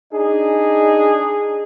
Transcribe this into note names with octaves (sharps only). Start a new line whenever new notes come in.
D4 D#4 G#4